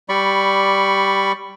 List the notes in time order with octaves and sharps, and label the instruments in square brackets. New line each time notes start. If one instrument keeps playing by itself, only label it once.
[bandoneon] G3 D5 B5 C#6